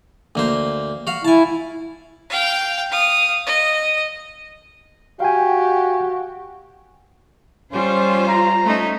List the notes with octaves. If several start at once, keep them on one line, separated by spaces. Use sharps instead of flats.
D2 A#3 C5
F#4 F5
E4 G#5 A5
F5 G5
F5 D#6
D#5
F#4 G4 F5 G5 G#5
G3 C#4 F4 C5
A#5
A3 C#4 D#4